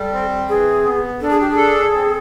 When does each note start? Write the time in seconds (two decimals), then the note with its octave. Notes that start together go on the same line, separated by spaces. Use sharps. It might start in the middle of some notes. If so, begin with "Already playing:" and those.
Already playing: G3 A4
0.12 C4
0.49 E3 G#4
0.85 B3
1.21 D4 A4
1.30 G#4
1.40 G4
1.51 G#4
1.57 A4
1.93 C4